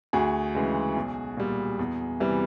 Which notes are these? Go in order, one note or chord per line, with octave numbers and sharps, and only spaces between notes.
D2 F#4 G#4
C#3 E3 G#3
B1
A#2 G3
E2
C3 E3 G3